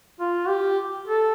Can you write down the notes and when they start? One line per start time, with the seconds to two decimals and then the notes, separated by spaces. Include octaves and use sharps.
0.20 F4
0.48 G4
1.08 A4